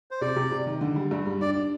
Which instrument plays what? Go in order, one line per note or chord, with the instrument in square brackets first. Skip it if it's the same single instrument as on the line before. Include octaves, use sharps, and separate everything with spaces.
[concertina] C5
[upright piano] C3 [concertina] D5
[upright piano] C3
C3
D#3
D3
G3
G2
G3
[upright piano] D4 [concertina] D5
[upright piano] D4